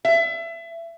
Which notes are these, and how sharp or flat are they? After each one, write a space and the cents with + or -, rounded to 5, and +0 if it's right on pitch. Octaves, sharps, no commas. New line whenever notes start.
E5 +25